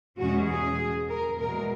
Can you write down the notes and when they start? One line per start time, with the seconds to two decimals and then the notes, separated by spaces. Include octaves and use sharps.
0.19 E2 B2 G#3 C#4 F#4
0.49 G#4
1.09 A#4
1.38 E2 B2 G#3 A#4